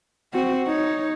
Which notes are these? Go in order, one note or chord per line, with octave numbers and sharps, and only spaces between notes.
C4 F#4
D#4 C#5